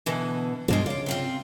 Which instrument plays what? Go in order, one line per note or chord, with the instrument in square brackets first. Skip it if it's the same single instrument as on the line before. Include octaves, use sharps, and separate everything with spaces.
[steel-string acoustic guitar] B2 D3 E3
[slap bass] G2 B2 F3 [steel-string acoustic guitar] D3 G#3 F4
[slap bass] C#3 [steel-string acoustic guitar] F4 D5
[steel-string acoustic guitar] C3 C4 F4